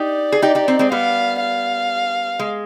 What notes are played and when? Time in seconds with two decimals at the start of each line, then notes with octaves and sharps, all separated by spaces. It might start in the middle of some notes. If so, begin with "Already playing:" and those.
Already playing: D#4 G4 D5
0.32 G#4
0.42 D#4 G4
0.55 D#4 G4
0.68 C4 D#4
0.79 G#3 C4
0.92 G3 B3 F5
1.41 F5
2.39 G#3